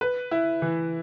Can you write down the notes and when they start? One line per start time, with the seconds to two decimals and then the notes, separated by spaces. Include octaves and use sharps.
0.01 B4
0.31 E4
0.62 E3